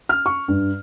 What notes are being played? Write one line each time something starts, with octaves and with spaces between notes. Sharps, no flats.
F6
C#6
G2